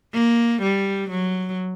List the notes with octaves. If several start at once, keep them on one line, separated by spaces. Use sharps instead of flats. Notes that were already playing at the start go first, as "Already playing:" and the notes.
A#3
G3
F#3